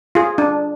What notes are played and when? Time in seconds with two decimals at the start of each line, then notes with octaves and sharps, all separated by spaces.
0.15 F4 G#4
0.38 D4